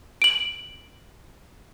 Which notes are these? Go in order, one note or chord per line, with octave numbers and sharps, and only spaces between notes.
D7 F#7